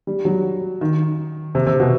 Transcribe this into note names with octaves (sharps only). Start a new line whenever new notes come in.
G3
F#3
D#3
C3
C3
B2